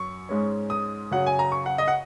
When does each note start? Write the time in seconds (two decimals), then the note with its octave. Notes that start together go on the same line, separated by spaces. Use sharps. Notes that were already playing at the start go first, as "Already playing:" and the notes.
Already playing: F#2 F#3 C#6
0.29 G#2 G#3 C#4
0.70 D#6
1.11 F#2 C#3 F#3 C#4 F#5
1.27 G#5
1.39 A#5
1.52 C#6
1.66 F#5
1.78 D#5
1.88 F#5